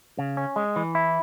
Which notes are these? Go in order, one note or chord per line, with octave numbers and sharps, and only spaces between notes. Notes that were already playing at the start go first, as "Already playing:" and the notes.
C#3
C#4
G#3
E3
E4